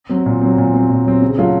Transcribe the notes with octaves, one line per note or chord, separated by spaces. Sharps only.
F#3 C4
A#2
F#3 C4
A#2
F#3 C4
A#2
F#3 C4
C#3
F#3 A3 C#4 F4